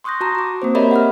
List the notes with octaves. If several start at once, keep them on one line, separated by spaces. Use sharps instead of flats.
C6 C#6 D#6 F#6 G6 A#6
F#4 A5 A#5
A#5 D6
A#3 C4 C5
G4 A#4 C#5 D#5 E5 B5
F#5 B5 F6